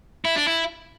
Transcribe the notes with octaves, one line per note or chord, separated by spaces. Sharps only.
E4
D4
E4